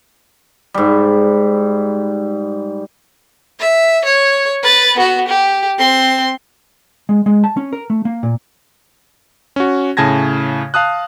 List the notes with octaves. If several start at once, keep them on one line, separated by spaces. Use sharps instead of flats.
G#2 G3
E5
C#5
B4 A6
B3 F#4
G4
C4 C6
G#3
G#3
A5
C#4
A#4
A3
A#3
A#2
C#4 F#4
A2 C#3 G#5 A5 G#6 A#6
F5 A5 D#6 F#6